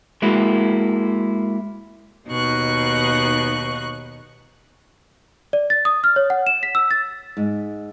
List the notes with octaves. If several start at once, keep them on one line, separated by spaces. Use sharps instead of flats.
G#3 A#3 E4 F#4
D#2 B2 D#4 C#6 F#6
D5
A6
D#6
F6
C#5
F#5
E7
B6
E6
A6
G#2